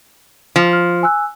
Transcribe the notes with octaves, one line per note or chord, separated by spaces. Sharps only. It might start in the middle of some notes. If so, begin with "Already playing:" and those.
F3
F6
G#5 E6 F#6